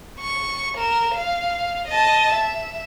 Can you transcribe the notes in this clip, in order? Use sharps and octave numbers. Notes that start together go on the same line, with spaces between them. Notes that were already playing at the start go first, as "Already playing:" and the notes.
C#6
A#4 E7
F5
D#5 A5
E5